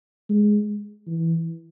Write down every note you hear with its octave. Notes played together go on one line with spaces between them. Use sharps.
G#3
E3